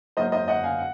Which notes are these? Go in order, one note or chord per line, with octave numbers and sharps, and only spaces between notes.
G#2 F#3 A#3 C5 D#5
C5 D#5
D#5 F#5
F5 G#5
F#5